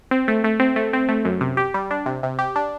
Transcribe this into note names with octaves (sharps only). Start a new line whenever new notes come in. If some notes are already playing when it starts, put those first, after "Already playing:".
C4
A3
A3
C4
A3
C4
A3
F#2
C3
G4
G3
D4
C3
C3
G4
D4